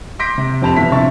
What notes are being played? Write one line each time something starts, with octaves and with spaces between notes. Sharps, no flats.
C6 D6 G6 A#6 B6 D7
C3
F2 C4 G4 A5 B5 F7
G1 B2 E3 E5 B6
A#1 C3 C4 E5 C#6 A6